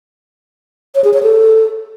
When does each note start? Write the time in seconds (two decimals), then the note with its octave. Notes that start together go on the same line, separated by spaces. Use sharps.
0.95 C#5
1.04 G#4
1.14 C#5
1.23 A4